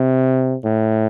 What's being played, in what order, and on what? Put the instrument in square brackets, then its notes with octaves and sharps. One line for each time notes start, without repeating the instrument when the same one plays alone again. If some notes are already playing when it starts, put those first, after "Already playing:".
Already playing: [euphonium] C3
A2